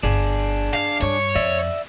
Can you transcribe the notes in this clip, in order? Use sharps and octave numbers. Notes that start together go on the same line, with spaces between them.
G1 D4 G#4
F5
G2 C#5
F2 D5 E5